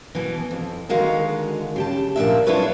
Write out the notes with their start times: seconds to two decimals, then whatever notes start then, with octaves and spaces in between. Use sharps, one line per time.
0.15 B2 E3
0.51 F2
0.89 D3 D#3 G#3 F#4 F5
1.76 C#3 G4 A5
2.16 A#2 F3 D4 E5
2.46 D4 E4 F4 A4 B4 C#5